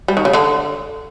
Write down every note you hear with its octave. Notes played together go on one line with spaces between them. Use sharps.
G3
D#3
C#3
D3